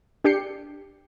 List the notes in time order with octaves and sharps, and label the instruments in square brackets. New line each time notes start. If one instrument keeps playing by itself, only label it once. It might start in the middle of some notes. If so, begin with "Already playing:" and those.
[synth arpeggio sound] D4 G4 G6 C7 C#7